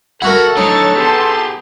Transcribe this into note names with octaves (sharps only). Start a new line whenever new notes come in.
E4 F#4 A4 A#4 F#5
D3 F#3 D#4 C#5 C#6 A6
B3 G4 G#4 A5 C6